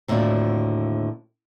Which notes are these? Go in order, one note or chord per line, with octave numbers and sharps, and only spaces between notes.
D#2 A2 D3 C4 F4 F#4